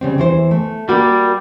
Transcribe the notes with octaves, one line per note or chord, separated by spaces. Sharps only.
C#3 G3 C4
E2 E3 C5
A3
G3 A#3 F#4